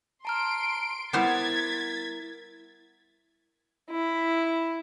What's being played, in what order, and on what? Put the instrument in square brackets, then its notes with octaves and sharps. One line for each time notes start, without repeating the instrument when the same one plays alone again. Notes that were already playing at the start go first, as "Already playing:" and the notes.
[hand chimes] A5 A#5 F6 [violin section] C6 D7
[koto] G3 B3 C5 [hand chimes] E4 A#4 [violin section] G#6 A6 B6
[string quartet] E4